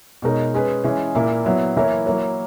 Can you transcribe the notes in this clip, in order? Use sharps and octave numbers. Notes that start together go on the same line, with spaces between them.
B2 G#3 D#4 A#4 C#5
G#3 C#4 G#4 B4
E3 G#3 C#4 G#4
A#2 A#3 E4
F#3 B3 E4
E3 A#3 E4 A#4 C#5
F#3 A#3 E4 A#4 C#5